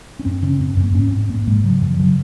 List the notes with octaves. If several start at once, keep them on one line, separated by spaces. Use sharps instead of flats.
C#4
F#2 C4
C#3 C#4
F#2 C4
F#2
A#3
G#2 C#4
G#2 C4
G#2 A#3
G#2 G#3
C#3 F#3
F#2 F3
C#3 F#3